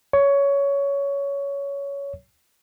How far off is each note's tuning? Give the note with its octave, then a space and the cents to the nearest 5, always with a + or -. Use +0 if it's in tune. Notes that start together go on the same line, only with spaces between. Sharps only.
C#5 +15